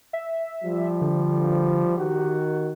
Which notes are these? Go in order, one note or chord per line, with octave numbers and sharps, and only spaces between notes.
E5
F3 G3
D3
D#3 F#4 G4